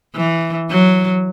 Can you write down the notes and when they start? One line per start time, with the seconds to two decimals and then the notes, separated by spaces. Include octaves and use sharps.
0.16 E3
0.70 F#3